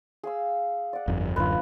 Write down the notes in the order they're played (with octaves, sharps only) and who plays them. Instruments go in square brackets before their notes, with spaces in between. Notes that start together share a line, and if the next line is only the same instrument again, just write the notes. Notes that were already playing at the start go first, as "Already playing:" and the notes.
[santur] G#4 F5 E6
D5 F#5
[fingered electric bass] G1 F2
[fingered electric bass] D1 F#2 D3 [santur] F4 B4